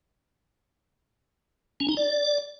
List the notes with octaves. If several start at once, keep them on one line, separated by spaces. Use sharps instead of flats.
C#4
D#4
D5